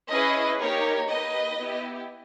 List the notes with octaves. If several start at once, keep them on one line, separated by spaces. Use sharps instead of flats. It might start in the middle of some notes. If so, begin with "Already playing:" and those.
C#4 E4 G#4 B4 D#5
A#3 D#4 G4 A#4 C#5
A#3 D#4 G4 B4 D#5
B3 E4 G4